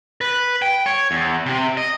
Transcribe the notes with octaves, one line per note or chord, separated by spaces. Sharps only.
B4
G5
C#5
E2
C3 C4
D#5